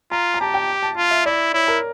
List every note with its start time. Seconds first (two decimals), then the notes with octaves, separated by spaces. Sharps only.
0.11 F4 A#5
0.34 A#5
0.41 G4 A5
0.54 G5
0.83 A5
0.97 F4
1.11 E5
1.26 E4 D5
1.53 E4 C#5
1.68 A#4